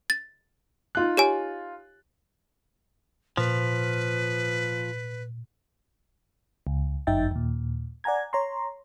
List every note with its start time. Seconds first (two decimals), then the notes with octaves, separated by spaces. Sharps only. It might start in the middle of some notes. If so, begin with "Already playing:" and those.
0.10 A6
0.95 D#4 F4 F#6
1.17 G4 C#5 G#5
3.37 A#2 F3 B4
6.67 C#2
7.07 G1 F#2 D#4 E5 G5 A6
7.31 D#2 A#2
8.04 D5 F#5 G#5 A#5 G#6
8.33 C#5 A#5 C6